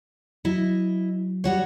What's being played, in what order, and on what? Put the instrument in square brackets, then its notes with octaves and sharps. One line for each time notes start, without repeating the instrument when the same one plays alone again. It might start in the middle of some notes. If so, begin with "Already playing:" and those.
[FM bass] F#3 [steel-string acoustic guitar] E4 D#5
[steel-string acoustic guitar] G3 F#4 C#5